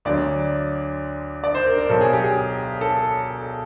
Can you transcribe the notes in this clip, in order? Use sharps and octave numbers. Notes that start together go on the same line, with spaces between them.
D2 D3 F#3 D5
D5
C5
A#4
A#4
B1 B2 F#3 A4
G#4
G4
G#4
A4